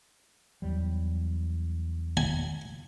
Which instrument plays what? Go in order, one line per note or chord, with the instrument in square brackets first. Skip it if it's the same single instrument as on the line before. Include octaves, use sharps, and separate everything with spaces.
[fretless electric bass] E2 F#3 G3
[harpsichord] G#5